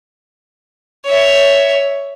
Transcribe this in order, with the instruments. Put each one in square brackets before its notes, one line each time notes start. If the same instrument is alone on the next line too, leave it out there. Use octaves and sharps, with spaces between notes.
[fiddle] C#5 E5